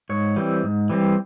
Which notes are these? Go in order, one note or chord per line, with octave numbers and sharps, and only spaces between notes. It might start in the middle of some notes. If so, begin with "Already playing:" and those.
G#2 C#5
E3 G3 C4
G#2
E3 G3 C4